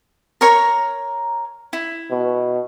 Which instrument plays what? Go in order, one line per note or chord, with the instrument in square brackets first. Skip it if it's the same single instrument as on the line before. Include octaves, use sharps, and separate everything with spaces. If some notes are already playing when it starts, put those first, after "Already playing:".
[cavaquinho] A#4 C#5 A#5
E4
[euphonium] B2